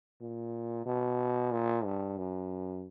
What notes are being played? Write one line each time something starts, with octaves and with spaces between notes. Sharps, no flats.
A#2
B2
A#2
G2
F#2